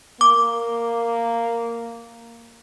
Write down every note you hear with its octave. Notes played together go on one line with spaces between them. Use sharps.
A#3 D6